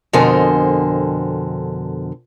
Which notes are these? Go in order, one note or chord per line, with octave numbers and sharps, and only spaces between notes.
F2 B2 D3 A#4 C5 G#5